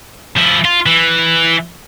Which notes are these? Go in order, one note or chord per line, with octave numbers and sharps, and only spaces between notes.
F3 E4
F4
E3